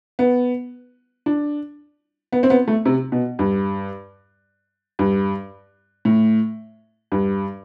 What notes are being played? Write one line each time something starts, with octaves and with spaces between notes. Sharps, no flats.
B3
D4
B3
C4
B3
A3
C3
B2
G2
G2
A2
G2